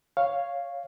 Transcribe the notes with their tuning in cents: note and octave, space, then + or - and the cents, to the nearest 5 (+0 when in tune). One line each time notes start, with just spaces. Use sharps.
C#5 +0 F5 +0